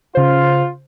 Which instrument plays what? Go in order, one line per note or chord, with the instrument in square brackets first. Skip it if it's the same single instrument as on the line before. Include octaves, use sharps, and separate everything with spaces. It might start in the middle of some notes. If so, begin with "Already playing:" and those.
[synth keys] C#3 C5 [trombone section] F4